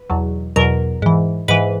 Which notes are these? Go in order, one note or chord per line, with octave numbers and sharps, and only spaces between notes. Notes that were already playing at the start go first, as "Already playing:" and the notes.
Already playing: B4
E2 B2 F#3
E2 B2 F#3 A#4
G#2 E3
G#2 E3 B4